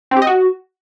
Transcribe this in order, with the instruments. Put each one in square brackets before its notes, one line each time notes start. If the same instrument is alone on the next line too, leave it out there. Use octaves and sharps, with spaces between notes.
[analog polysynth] C4
G4
D#5
F#4